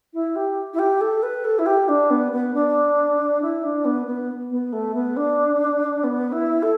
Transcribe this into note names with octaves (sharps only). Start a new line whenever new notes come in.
E4
G4
E4
G4
A4
B4
A4
E4
G4
D4
B3
B3
D4
E4
D4
B3
B3
B3
A3
B3
D4
B3
E4
A4